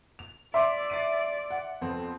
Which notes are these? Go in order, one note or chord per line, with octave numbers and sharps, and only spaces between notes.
F7
D5 E5 C6 D6
A6 C7 D#7
F#5
F2 B3 C4